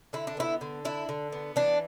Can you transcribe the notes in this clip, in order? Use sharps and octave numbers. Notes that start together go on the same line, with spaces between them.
D3 E4
D4
B3 E4
D3
D4 E4
D3
B3
E3 D4